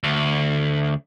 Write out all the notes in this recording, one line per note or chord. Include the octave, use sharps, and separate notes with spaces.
D2